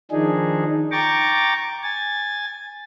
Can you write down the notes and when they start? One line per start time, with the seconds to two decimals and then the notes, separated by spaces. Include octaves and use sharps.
0.11 D#3 F3 D4 D#4 G#4
0.92 G5 A#5 C#6 D6 A6
1.83 G#5 A6